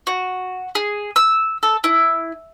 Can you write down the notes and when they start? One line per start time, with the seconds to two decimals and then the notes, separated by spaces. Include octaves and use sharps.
0.07 F#4
0.75 G#4
1.16 E6
1.63 A4
1.84 E4